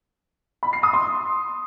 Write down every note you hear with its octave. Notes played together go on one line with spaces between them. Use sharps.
B5
C7
D#6
C6